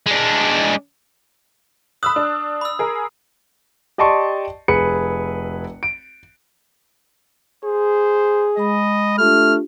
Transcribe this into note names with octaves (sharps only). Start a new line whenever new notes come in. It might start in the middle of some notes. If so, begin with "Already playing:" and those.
G#3 D4
B5 D#6 E6 F#6
D4
B5 E6
G#4 A#4
G4 D5 D#5 A5 C6 C#6
F1 G#4 B4 C#7
D7
G#4 C5
G#3 D#5 B5
A3 D4 F4 G4 F6